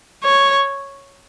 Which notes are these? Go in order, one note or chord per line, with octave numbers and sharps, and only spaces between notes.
C#5